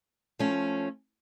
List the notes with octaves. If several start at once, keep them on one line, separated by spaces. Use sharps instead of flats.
F3 A3 C#4